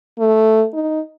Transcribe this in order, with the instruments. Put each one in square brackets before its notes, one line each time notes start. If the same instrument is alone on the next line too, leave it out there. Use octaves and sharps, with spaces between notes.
[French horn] A3
D#4